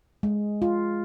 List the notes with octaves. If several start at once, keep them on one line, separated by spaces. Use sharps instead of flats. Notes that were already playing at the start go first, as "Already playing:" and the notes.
G#3
F4